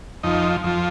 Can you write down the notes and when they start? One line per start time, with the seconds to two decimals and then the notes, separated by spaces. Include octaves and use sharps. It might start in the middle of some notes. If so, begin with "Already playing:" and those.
0.23 F2 F3 D#4
0.64 F2 F3